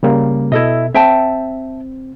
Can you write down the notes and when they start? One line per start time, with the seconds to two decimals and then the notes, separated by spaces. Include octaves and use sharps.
0.03 C#3 G3 A#3
0.52 B2 E4 A4 D#5
0.94 C4 E5 G5 A5